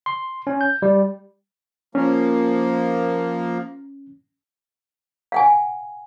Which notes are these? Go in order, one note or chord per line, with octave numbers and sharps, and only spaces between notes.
C6
C#4
G6
G3
F3 A#3 C#4
F5 F#5 G#5